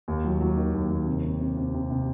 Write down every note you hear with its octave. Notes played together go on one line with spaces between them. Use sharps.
D#2
F#3
F#3
D#3
D#2
D#2
C3
C3
C3
C3
C3
C3